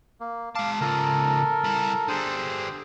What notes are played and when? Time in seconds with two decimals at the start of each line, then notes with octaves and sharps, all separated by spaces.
0.20 A#3
0.55 G#3 F5 A5 D6
0.81 C#2 F3 A4 A#4
1.64 G3 E4
2.09 D3 G3 G#4 C5 E6